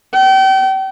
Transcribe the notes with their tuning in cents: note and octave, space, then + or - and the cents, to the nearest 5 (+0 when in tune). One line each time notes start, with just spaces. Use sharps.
G5 -35